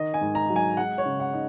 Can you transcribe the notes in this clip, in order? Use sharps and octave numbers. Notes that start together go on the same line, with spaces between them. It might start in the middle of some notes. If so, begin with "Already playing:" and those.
Already playing: D#3 D#5
G#5
G#2
A#5
F#3
G#5
G#3 F#5
C#5
C#3
F#5
D#4